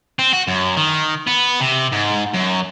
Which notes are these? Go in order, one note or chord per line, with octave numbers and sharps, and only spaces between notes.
C4
F#4
F#2
D#3
B3
C3
G#2
F#2